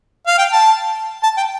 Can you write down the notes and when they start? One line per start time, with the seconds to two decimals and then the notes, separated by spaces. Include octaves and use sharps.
0.27 F5
0.38 G5
0.52 A5
1.23 A5
1.37 G5